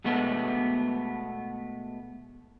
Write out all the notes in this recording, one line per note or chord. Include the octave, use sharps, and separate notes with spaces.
B2 G#3 A3 B3 A4